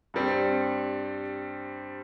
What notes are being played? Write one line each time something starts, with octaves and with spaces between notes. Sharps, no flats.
G2 G3 C4